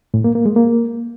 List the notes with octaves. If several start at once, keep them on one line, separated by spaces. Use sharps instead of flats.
A2
A#3
A#3
G#3
A#3